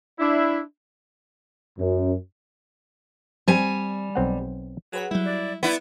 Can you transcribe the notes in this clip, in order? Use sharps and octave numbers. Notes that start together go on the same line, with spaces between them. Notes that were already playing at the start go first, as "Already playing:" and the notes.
D4 E4
F#2
G3 C4 G#5
B1 C4 F#5
F#3 G#4 B4 F#5
F#3 G3 E4
D5
B3 E4 D5